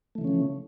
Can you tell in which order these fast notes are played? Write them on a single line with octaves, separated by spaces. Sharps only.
A3 E3 C#3 C#4 F3